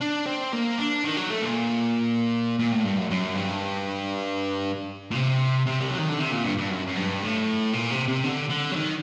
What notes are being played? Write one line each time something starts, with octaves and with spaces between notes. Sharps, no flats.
D4
C4
A#3
D4
D#3
F#3
A3
A#2
A#2
A2
G2
F#2
F#2
G2
A#2
C3
C3
G3
F#3
D#3
D3
C3
A#2
G2
G2
F#2
F#2
G2
A2
A#2
C3
C3
D3
D3
F#3
D#3